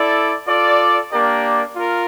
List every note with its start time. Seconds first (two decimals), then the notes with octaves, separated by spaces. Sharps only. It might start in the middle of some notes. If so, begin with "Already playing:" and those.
Already playing: E4 A4 D5
0.48 F4 A4 D5
1.12 A#3 D4 G4 A#4 D5
1.76 F4 A#4